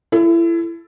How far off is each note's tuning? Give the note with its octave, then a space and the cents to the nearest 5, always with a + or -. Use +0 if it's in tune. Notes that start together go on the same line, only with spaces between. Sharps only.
E4 +30 A4 +0